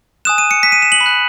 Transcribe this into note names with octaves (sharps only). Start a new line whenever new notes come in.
G#5 D#6 F#6 E7
D#7
C#7
B6
D#7
E7
F#7
B5
F#6